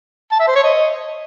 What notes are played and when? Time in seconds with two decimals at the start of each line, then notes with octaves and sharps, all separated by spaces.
0.31 A5
0.39 E5
0.47 C5
0.56 C#5
0.64 D#5